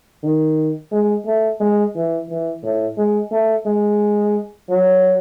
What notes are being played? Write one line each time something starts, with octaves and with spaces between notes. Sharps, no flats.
D#3
G#3
A3
G#3
E3
E3
A2
G#3
A3
G#3
F#3